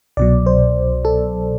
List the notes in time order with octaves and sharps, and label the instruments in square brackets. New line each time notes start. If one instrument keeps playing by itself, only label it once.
[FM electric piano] C2 B2 F#3 D5
C5
A4